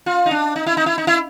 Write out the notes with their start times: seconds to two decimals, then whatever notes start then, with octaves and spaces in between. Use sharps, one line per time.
0.06 F4
0.26 D#4
0.31 D4
0.56 D#4
0.66 E4
0.77 D#4
0.86 E4
0.98 D#4
1.07 E4